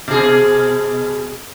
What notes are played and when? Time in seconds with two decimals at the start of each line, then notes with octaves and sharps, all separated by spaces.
0.08 B2 G#4